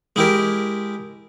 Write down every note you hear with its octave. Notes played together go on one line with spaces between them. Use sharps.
G#3 E4 G4 A#4